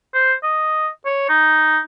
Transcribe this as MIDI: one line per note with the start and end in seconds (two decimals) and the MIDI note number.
0.14 0.33 72
0.43 0.88 75
1.06 1.29 73
1.29 1.80 63